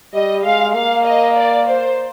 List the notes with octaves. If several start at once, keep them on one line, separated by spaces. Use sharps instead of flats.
G3 D#5
G#3 F5
A#3 F5
D#5
D5
C5